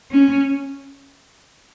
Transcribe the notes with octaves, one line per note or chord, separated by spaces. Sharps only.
C#4